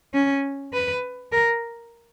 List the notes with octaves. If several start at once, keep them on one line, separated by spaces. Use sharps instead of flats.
C#4
B4
A#4